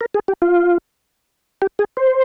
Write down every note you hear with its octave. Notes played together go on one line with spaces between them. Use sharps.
A#4
G#4
G4
F4
G4
G#4
C5